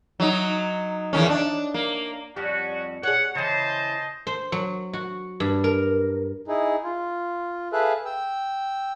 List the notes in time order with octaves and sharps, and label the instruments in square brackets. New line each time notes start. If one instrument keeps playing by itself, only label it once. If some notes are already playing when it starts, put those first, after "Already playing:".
[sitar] F#3 D#4
E2 D#3 C#4
D4
A#3
[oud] F2 G3 [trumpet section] C#4 F#4
[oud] G#4 C#5 [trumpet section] F#5
[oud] C#3 E3 [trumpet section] C5 D#5 A5
[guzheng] C5
F#3
F#4
G2
A#4
[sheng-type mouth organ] D#4 E4 G#4
F4
G#4 A4 B4 E5 F5 F#6
G5 E6